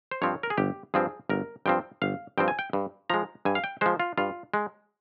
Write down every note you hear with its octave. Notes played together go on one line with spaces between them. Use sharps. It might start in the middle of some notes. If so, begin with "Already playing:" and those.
C5
G2 F3 C4 C#5
A#4
G#4
G1 G4
G2 F3 C4 G#4
G1 A#4
G2 F3 C4 G5
G1 F5
G2 F3 C4 G5
G#5
G5
G2
F3 G#3 A#5
G2 G#5
F5
G5
F3 G#3 C5
F4
G2 F4
G#3